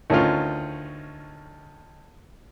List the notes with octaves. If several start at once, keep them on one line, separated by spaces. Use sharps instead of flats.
D2 D#3 C#4 D#4 F4